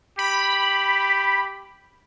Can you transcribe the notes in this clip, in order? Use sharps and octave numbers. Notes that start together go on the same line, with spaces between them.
G4 B5